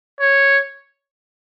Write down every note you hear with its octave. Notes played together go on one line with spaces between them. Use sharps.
C#5